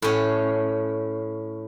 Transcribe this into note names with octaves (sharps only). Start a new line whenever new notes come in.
A2 C#4